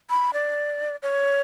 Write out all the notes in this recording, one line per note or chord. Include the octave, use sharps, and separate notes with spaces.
B5
D5
C#5